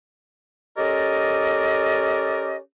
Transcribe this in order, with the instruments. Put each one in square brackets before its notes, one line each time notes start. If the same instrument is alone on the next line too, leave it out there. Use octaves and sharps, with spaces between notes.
[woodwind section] C#4 G4 A4 A#4 D5 D#5